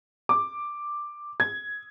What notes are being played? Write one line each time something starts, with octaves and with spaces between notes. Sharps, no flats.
D6
G#6